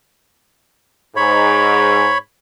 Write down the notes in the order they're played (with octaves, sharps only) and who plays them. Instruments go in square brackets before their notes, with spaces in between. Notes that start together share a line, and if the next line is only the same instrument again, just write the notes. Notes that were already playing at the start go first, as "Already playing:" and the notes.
[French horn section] G#2 [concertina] C#5 B5